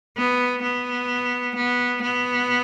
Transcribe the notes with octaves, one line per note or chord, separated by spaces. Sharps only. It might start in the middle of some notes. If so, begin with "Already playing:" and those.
B3
B3
B3
B3